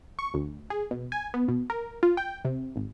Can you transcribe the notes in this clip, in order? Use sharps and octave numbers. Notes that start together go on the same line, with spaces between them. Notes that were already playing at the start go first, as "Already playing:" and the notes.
C#6
D2
G#4
B2
G#5
B3
B2
A#4
F4
G5
C3
G#1